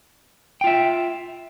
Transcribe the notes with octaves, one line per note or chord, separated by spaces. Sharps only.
F4 E5 G5